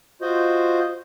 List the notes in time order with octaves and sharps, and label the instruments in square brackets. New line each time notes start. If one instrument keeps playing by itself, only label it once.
[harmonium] F4 F#4 C5 D#5